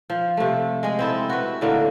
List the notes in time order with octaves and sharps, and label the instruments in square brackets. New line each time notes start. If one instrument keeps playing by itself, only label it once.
[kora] F3
C3 A3
G#3 G#4
C4 E4 A4
F#4 B4
A2 D3 A#3